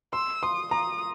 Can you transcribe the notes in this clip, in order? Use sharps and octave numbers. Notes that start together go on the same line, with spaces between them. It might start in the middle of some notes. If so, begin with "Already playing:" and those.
C6 E6
C6 D#6
A#5 D#6